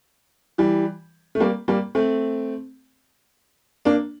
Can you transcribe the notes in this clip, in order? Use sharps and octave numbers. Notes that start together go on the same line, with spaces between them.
E3 G3
A3
G3 A#3
G3 A#3
A3 C4
A#3 D4